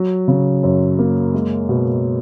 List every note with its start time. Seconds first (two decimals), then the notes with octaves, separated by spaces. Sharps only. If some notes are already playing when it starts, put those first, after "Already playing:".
Already playing: F#3
0.28 C#3
0.63 F#2
0.99 A#3
1.34 G#3
1.69 B2